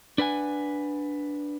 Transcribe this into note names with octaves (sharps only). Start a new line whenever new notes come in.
D4 B4 F#5 G#5